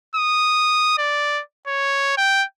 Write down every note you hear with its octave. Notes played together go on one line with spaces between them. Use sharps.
D#6
D5
C#5
G5